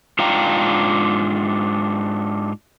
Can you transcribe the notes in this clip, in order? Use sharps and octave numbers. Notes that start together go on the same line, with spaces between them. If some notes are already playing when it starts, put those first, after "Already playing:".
G#2 D4 F4 F5 G5 A#5